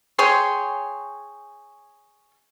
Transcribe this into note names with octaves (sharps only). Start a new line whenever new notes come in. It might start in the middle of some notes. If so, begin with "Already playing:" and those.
G#4 C#5 G5 C6